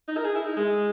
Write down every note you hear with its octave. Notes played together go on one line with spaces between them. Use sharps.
D#4
A#4
G#4
E4
D#4
G#3